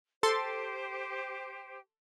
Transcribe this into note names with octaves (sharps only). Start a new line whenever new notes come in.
G4 A4 C5 C6 A6